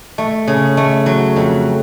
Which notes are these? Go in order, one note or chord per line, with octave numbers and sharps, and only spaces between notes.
A3
C#3
A3
F#3
F2